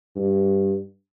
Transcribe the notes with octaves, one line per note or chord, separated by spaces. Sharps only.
G2